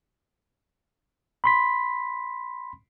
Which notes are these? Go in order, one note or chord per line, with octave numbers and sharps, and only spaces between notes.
B5 C6 B6